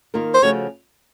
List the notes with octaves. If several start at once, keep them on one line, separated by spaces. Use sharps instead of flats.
D#3 A#3 F4 A#4
C5
C#3 F3 A3 C#4 F#4 C#5